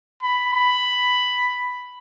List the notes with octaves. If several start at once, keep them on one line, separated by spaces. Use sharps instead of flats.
B5
B5